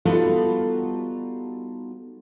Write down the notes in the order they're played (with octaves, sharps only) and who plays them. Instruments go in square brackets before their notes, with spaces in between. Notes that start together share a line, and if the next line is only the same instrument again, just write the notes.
[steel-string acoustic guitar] G3 B3 D#4 F4 F#4 A4